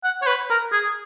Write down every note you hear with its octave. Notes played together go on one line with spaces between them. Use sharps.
F#5
C#5
B4
A#4
G#4